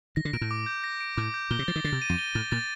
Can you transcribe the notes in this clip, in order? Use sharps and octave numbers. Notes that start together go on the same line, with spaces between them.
D#3 A#6
D3
A#2 D7
A2
D6
G6
A#6
D7
A2 D6
G6
A#2 G7
C3
F3 A6
D#3
D3 A6
C3
D#7
F2
G7
A2 A6
A#2 A6